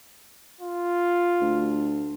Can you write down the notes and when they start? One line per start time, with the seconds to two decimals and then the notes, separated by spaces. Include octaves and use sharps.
0.61 F4
1.41 D2